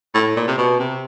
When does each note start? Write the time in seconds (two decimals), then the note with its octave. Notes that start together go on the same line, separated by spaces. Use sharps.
0.14 A2
0.36 A#2
0.47 C3
0.58 B2
0.79 C3